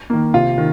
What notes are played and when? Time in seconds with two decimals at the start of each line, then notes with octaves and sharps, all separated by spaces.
0.10 D#3 A#3
0.34 C3 F4
0.58 D#3